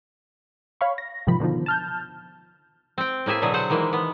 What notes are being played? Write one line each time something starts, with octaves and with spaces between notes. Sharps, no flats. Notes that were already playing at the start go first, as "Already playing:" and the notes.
C#5 F5 B5 C#6
A#6
G#2 C3 D#3 F3 B5
B2 D3 D#3 F3
A5 F6 G6
C4 G5
A2 A#3 G#4 E5 G#5
B2 D3 F#3 G#4
C5 F#5
D#3 E3 G#3 A#3
B3